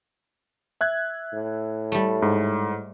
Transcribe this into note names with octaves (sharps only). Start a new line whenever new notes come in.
E5 F#6 G#6
A2
G3 A3
G#2